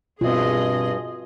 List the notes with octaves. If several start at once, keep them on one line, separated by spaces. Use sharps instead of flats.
G2 B2 C4 F4 F#4 G#4 D#5 E5